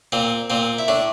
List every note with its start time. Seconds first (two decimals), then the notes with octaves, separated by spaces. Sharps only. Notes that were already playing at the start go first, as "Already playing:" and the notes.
0.12 A#2 C4
0.50 A#2 C4
0.79 E4
0.88 A2 D4